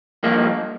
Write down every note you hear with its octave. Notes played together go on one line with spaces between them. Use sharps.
G2 F3 G#3 A#3